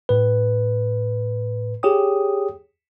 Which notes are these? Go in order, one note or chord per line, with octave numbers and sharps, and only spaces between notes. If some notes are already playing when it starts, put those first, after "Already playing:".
A2 B4
G4 G#4 C#5 G5 D#6